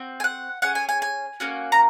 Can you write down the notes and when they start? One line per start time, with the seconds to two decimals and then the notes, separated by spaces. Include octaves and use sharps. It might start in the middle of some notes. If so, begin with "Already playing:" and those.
Already playing: C4 F#4
0.20 G#5
0.24 F#5
0.62 C#4 G#4 F#5
0.75 G#5
0.89 G#5
1.02 G#5
1.40 A#3 C#4 F#4
1.72 A#5